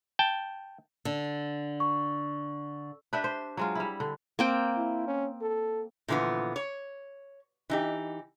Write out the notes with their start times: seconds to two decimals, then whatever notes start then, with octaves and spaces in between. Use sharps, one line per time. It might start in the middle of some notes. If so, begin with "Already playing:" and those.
0.19 G5 A5
1.05 D3
1.80 C#6
3.13 D4 G4 B4 E5
3.24 C5
3.57 F#3 G#3 F4
3.75 G3 E4
4.00 D3
4.39 A#3 C4 G5
4.77 E4
5.07 C#4
5.41 A4
6.08 A#2 D3 E3 F3 B3
6.56 C#5
7.70 E3 D#4 G4